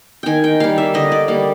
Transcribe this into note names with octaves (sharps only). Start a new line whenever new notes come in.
D#3 G5 G#5
G5
G3 A#3 F5
E5
D3 D#5
D5
G3 A#3